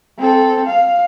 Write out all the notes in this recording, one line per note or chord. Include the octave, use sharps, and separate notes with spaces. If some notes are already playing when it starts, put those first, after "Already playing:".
C4 A4
F5